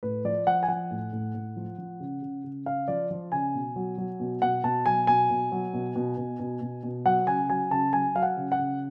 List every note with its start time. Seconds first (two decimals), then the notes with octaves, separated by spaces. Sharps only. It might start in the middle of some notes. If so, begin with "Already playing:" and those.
0.03 A2 B4
0.25 F3 D5
0.47 F3 F#5
0.63 G#5
0.68 F3 F#5
0.91 A2
1.13 A2
1.35 A2
1.56 F3
1.78 F3
2.00 C#3
2.22 C#3
2.44 C#3
2.66 C#3 F5
2.88 F3 D5
3.11 F3
3.32 C#3 G#5
3.54 B2
3.76 F#3
3.98 F#3
4.20 B2
4.42 B2 F#5
4.64 B2 A5
4.86 F#3 G#5
5.07 B2 G#5
5.30 B2
5.52 F#3
5.74 B2
5.96 B2
6.17 B2
6.40 B2
6.61 B2
6.83 B2
7.05 F#3 F#5
7.27 C#3 G#5
7.49 F#3 G#5
7.71 C#3 A5
7.93 F#3 G#5
8.15 F#3 F5
8.23 F#5
8.37 C#3
8.52 F#5
8.59 C#3